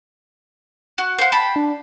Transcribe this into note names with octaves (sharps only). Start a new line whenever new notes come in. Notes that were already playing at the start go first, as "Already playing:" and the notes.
F#4
F#4 C5 F5
G5 A5 B5
D4